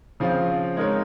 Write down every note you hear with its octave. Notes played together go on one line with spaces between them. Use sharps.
C#3 F3 C4 F4
G#3 D#4 A#4 C#5